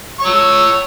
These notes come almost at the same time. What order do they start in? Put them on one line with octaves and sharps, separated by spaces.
C#6 C#5 E6